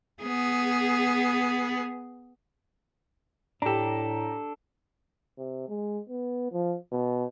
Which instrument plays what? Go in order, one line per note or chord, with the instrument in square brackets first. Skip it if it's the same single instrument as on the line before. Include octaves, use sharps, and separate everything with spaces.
[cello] B3 G#4
[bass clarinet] A2 [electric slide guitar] D4 A4 [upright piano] G4 A#5
[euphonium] C3
G#3
B3
F3
B2